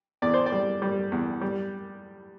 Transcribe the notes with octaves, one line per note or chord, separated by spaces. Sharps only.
E2 D5
C5
D5
G3
G3
E2
G3